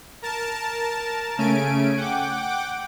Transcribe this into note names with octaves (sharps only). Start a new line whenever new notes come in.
A#4 A5
C#3 A3 C#4 G#5 D7
F#5 G5 D6